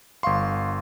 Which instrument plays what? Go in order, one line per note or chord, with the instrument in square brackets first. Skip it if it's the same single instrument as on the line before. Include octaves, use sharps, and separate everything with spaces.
[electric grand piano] G1 C6 [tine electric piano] F5 C#6